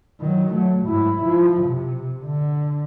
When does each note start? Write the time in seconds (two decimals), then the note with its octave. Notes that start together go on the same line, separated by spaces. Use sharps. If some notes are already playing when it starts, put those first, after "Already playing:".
0.20 D#3 F#3
0.53 F#3 A3
0.87 G#2 E4
1.25 F3
1.64 C3
2.24 D3